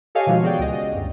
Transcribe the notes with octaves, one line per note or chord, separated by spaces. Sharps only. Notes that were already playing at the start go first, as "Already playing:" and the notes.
G4 A4 C#5 D#5 F5 G#5
B2 D#3 F3 G#3 F#4
B3 F#4 G#4 D5 G5
C#2 D#5
D2 G2